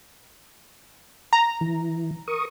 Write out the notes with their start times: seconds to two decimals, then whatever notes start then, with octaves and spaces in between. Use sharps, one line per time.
1.33 A#5
1.61 E3
2.28 A#4 C#6 D#6